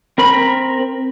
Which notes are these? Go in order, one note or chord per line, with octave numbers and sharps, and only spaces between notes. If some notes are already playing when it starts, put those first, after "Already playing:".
C4 A#4 B5